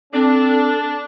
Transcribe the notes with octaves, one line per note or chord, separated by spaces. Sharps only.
C4 D4 A4